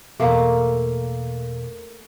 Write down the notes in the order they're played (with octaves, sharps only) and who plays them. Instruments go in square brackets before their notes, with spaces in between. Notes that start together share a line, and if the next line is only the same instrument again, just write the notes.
[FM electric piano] E2 B2 [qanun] A3 A#3